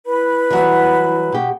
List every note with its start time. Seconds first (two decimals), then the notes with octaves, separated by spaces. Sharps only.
0.05 E4 B4 B5
0.50 E3 F#3 G3
1.32 B2 G4